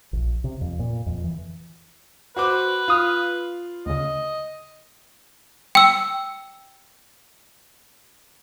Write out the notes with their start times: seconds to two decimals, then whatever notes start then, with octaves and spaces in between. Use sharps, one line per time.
0.13 A#1
0.44 C3
0.61 F2
0.79 A#2
1.06 F2
1.24 E3
2.36 F#4 B4 C5 D6
2.88 F4 F5 D#6 F6
3.86 D2 C#3 D#5
5.75 G5 E6